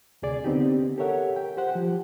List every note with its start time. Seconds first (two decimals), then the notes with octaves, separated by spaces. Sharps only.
0.22 D2 C3 G#4 D5
0.44 D3 B3 C4 D#4 G4
0.98 G4 A4 A#4 C#5 E5 F#5
1.36 G5
1.57 G4 C5 F#5
1.75 F3 G4